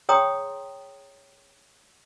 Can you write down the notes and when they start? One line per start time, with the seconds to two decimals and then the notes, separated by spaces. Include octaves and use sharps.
0.09 G#4 C#5 G5 A#5 C6 D#6